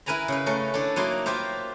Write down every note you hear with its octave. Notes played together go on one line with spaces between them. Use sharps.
E4 A#4 B4 G#5 A#5 B5
C#3 B4
A3 C#4 A#4
D4 E4 A4
F#3 A#3 D#4 E4 C6
F4 G4 A#4 C5 E5